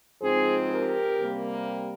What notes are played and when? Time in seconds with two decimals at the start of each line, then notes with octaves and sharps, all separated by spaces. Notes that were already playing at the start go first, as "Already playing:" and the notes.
0.21 G#2 F3 C4 G#4 C5
0.70 G4 A#4
1.18 C3 G3 A#3